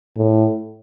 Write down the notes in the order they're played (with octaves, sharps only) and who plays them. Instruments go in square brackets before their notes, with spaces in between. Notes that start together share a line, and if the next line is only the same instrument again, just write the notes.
[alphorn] A2